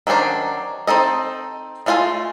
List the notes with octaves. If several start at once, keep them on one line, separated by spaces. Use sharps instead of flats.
D#3 F#3 C#4 D4 C5
C4 D#4 A4 D#5
G#3 A3 F4 F#4 G#5